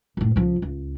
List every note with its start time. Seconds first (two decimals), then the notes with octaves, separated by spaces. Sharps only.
0.17 F#1 A2
0.36 C#2 F3
0.62 C#2